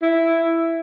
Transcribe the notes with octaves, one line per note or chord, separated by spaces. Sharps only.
E4